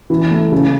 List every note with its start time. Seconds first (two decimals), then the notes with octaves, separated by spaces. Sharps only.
0.10 E3
0.31 A3
0.52 C#3